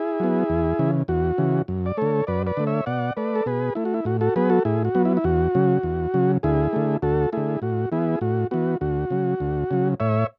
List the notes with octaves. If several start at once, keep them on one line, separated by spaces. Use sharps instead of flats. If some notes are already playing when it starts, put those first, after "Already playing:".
Already playing: E4 G#4
F#3 B3
E2
C#3 E3
E2 F#4
C#3 E3
F#2
D5
D3 A3 A4 C#5
F#2 B4 D5
B4 D5
D3 A3
C#5 E5
B2 D5 F#5
A3 B4 D5
A4
B2 G#4 B4
A3 E4
F#4
E4
A2 F#4
F#4 A4
F#3 B3 G#4 B4
F#4 A4
A2 E4 G#4
F#4
F#3 B3
E4
E4
E2 F#4
C#3 F#3
E2
C#3 F#3
D2 E4 G#4
D3 A3
D2 F#4 A4
D3 A3 E4 G#4
A2 F#4
E3 B3 E4 G#4
A2 F#4
E3 B3 F#4
D2 F#4
C#3 F#3
D2
C#3 F#3
A2 C#5 E5